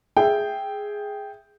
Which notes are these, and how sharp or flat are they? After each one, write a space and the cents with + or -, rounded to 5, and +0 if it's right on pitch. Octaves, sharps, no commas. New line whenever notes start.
G#4 +0 E5 +0 G5 +0